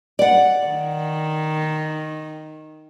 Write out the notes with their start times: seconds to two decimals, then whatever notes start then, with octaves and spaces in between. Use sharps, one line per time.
0.19 D5 F#5
0.66 D#3